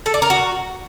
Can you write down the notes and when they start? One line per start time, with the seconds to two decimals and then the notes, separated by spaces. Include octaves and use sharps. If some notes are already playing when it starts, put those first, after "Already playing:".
0.06 A4
0.14 D5
0.22 A#4
0.30 F#4